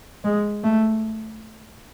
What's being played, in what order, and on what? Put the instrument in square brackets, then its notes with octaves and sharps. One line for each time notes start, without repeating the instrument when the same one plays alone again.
[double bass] G#3
A3